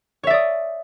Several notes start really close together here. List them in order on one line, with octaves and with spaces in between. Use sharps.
C#5 E5 D5 D#6